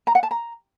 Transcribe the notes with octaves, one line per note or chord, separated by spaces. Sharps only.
A#5
F#5
A5
A#5